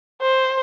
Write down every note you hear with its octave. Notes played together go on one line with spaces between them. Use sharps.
C5